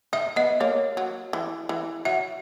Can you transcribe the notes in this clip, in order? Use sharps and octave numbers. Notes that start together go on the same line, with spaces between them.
D#4 E5
B3 D#5
A#3 C#5
F#3
E3
E3
F#3 E5